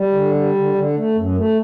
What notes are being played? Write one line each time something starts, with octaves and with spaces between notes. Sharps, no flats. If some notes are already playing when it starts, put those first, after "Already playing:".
Already playing: G3
D3
G3
D3
D3
A3
F#2
A3